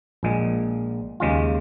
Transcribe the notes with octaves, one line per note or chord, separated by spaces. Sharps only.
A#1 A#2 G#3
D#2 C#3 G#3 F4